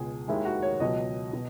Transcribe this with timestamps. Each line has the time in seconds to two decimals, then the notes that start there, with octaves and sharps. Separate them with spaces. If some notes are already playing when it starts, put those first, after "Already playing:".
Already playing: C#2 B2 G#3 G#4
0.28 D#2 D#3 G#3 E4
0.45 F#4
0.62 C#5
0.80 C#2 B2 F#3 D#5
1.33 B2